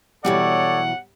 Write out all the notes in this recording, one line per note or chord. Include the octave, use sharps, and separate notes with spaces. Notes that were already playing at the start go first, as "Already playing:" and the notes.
B2 E3 F#3 G3 A4 C#5 D5 F#5